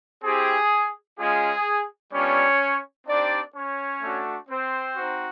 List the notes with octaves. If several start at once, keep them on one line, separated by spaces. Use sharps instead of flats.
C4 E4 G4 G#4
G#3 C#4 F4 G#4
G3 B3 C#4 D4 F4 C#5
C4 D4 D#4 G4 D5
C#4 C#5
A3 D4 F#4
C4 C5
C4 D#4 F#4